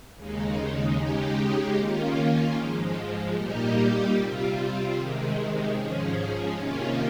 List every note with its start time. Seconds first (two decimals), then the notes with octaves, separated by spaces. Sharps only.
0.15 D#2 C#3 G#3 D#4
0.95 C#3 G#3 D#4 G4
1.75 D#3 A#3 C#4 F4
2.54 G#2 F3 G#3
3.34 A#2 G3 A#3 D#4 G4
4.14 C3 G3 C4 F4
4.94 C3 D#3 G#3
5.73 G#2 F3 G#3 C#4
6.53 C3 D#3 A#3 C#4 F4